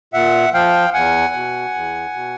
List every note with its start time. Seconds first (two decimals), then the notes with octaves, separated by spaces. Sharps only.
0.13 A#2 E5 F#5
0.54 F3 F5 G5
0.94 E2 F#5 G#5
1.34 B2
1.74 E2
2.14 B2